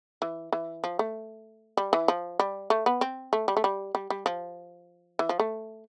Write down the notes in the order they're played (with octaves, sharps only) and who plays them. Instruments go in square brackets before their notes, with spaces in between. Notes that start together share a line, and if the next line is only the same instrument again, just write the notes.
[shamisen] E3
E3
F3
A3
G3
E3
F3
G3
A3
B3
C4
A3
G3
A3
G3
G3
G3
F3
E3
F3
A3